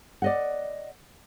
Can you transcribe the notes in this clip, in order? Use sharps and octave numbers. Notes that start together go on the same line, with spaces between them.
D5 D#5 F#5